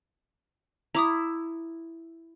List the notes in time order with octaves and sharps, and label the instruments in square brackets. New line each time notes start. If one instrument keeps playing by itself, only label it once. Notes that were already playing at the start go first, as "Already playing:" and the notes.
[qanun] E4 [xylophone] A#5 D6 D#6